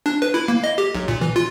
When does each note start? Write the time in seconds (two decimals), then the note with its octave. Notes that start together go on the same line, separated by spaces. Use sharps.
0.06 D4
0.22 B4
0.34 E4
0.48 A#3
0.64 D#5
0.78 G4
0.95 B1
1.08 A#2
1.21 E3
1.36 F4